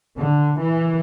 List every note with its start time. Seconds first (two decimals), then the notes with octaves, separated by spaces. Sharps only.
0.18 D3
0.61 E3